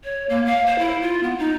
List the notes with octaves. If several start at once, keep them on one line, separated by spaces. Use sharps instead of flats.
C#5
A#3
F5
C5
E4
F4
B3
D#4